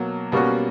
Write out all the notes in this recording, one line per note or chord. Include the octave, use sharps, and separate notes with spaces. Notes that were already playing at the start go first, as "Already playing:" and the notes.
Already playing: B2 F#3 A#3
B2 G3 A#3 C#4 F#4